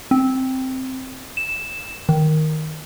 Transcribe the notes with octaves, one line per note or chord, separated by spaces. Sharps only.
C4
E7
D#3